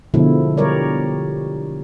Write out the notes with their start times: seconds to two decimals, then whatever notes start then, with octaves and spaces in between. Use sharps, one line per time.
0.14 B2 D3 F3 G#3 E4
0.57 G3 A#4 C#5 D5